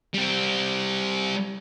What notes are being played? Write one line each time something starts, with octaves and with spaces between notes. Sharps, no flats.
G3 C4